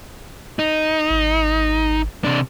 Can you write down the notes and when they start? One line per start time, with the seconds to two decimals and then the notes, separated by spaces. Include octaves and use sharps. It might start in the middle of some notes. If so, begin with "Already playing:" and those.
0.59 D#4
1.10 G#1
2.24 C3 D4